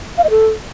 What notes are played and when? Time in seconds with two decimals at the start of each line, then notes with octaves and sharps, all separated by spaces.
0.18 F5
0.24 D#5
0.30 A4